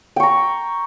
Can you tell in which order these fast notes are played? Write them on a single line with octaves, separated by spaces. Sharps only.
G5 C#6 A#5